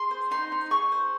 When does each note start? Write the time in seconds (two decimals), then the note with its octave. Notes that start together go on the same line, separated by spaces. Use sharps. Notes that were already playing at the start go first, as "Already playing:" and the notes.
Already playing: G#4 C6
0.11 C5
0.31 D#4 C6
0.52 D#4
0.71 G#4 C#6
0.92 C5